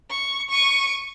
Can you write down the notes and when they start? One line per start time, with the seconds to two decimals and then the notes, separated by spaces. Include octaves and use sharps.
0.10 C#6
0.51 C#6 D#7